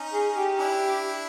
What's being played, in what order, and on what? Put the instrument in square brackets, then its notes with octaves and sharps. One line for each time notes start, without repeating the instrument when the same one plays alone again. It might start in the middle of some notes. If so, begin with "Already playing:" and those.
Already playing: [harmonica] C#4 D#4
[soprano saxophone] G#4
G4
[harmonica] D4 E4